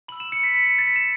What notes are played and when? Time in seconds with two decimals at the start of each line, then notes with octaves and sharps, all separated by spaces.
0.08 B5 F#7
0.12 E6
0.20 E7
0.32 C#7
0.43 B6
0.55 B6
0.66 C#7
0.79 A6
0.87 B6
0.96 E7